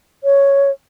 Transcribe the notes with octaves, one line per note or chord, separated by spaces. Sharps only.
C#5